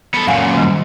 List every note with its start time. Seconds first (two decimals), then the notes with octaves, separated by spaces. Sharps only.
0.14 B3 A4
0.27 F#2 A#2 F5 F#5 G#5
0.54 D#3 G3